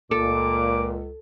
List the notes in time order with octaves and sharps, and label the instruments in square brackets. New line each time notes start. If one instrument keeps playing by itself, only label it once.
[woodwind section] C#2 [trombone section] A#2 [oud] A4 [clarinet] D6